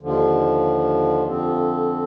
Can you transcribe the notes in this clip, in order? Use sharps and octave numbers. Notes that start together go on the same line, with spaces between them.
D#2 D3 F3
F2 D3 F3 C4